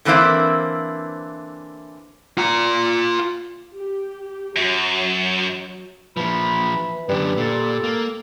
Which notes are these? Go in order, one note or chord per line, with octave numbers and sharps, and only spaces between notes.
D3 E3 A#3 C4 E4
F4 A#5
G4
F#2 F#3
A#2 E3 F3 B5
F#2 D3 G3 B4
A#2 A4
A#3